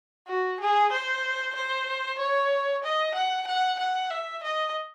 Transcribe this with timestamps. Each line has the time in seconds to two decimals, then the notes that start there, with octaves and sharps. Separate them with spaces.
0.27 F#4
0.60 G#4
0.92 C5
1.55 C5
2.19 C#5
2.83 D#5
3.15 F#5
3.47 F#5
3.79 F#5
4.10 E5
4.43 D#5